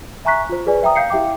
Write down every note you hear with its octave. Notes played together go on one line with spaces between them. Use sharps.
E5 G#5 A#5 C#6 F#6 B6
F4 C5
G#4 B4 D5 G#5
E5 G5 A#5 D#6
F5 G6 C7 C#7
E4 G4 E5 G5 D6